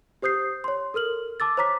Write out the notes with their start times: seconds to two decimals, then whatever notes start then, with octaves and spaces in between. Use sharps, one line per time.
0.22 G4 C5 D#6 G6 C7
0.64 C#5 C6
0.94 A4 A#4 F6 F#7
1.40 A5 D6 E6 A6
1.57 C5 C#5 A#5 D6 B6